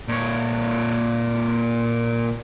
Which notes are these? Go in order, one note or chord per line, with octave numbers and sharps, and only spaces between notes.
A#2 C#5